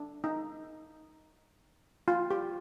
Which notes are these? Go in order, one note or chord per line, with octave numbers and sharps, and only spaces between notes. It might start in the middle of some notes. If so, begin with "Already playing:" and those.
Already playing: D4
D#4
F4
G4